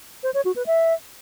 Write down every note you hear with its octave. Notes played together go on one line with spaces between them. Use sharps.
C5
C#5
F#4
B4
E5